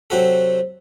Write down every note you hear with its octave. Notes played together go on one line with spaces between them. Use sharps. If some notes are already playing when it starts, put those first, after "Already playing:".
C3 F#3 C4 F#4 A4